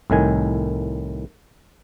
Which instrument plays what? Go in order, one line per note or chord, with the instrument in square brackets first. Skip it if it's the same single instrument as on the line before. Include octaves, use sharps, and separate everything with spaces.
[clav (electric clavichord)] C2 A2 D#3 G#5